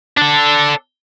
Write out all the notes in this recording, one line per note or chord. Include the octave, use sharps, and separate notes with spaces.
D4 A4